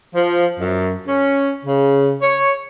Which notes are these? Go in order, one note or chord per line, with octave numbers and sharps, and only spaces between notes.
F3
F#2
C#4
C#3
C#5